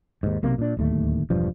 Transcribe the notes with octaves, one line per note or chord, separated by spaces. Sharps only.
D#2 G#2
B1 C3 A#3
A#2 D4
D1 D#2 A3
E1 G2 F3